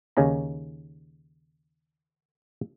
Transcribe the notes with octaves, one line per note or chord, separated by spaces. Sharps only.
D#2 C#3 C#4 D#4 A#5